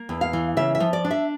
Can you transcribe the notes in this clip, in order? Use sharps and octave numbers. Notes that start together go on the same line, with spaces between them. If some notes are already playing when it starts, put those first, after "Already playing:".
Already playing: A#3
E2
F5
E3
C#3 E5
E5
F3
D5
D4
E5